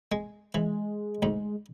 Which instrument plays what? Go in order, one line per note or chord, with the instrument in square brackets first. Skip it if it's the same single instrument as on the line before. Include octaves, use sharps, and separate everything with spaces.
[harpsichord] G#3
[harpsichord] E3 [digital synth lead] G#3
[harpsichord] D2 G#2